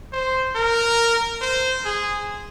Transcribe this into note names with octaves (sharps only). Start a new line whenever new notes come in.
C5
A#4
C5
G#4